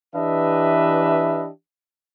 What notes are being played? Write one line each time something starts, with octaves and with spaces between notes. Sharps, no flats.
E3 D4 G4 B4 D#5 E5